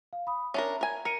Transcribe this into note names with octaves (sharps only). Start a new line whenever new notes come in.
F5
B5 D#6
C#4 D4 A#4 E5
A#4 G#5
A#4 A#5 C#7 D#7